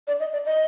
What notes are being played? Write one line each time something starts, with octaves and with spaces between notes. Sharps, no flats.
D5
D#5
D5
D#5